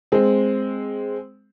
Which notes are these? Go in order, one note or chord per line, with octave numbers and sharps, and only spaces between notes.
G#3 C4